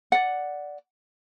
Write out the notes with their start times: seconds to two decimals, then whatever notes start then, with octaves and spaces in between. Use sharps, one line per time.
0.12 D5 F#5